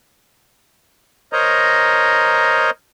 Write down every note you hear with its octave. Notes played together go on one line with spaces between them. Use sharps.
A#4 C5 C#5 D#5 A#5